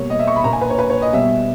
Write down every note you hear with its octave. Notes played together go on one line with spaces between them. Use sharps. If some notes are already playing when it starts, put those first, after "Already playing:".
Already playing: B2 G3 A#3 C#5
D#5
E5
C#6
B5
A#2 A#3 A#5
G#5
B4
C#5
B4
C#5
D#5
B2 G3 B3 E5